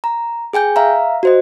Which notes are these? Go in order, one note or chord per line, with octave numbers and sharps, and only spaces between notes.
A#5
G#4 G5 G#5 G6
E5 F5 A#5
F#4 C5 D#5